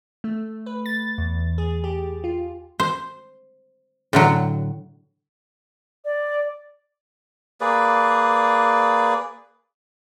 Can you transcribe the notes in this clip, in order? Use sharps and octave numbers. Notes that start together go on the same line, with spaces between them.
A3
B4
A6
E2
G#4
G4
F4
C5
A2 D3 F#3
D5
A#3 G#4 B4 D5